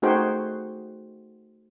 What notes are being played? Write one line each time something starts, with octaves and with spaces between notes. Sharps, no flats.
A3 D#4 F#4 G#4 C5 G5